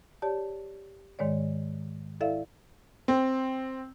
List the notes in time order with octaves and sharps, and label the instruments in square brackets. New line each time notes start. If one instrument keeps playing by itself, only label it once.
[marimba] G4 C#5 D5 A5
G#2 D#3 G#3 C#5 D5
E4 A4 D5 E5 F5
[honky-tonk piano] C4